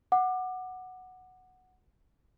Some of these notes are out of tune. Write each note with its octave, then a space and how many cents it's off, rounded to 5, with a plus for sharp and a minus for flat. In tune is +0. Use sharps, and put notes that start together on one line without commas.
F#5 +0 D6 +25